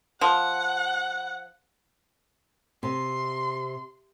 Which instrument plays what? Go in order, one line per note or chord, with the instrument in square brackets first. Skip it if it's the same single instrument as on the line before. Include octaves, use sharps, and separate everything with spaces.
[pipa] F3 [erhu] F#5
[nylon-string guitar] C3 [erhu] C6